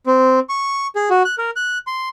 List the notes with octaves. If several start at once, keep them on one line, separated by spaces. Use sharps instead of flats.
C4
C#6
G#4
F#4
F#6
A#4
F#6
C6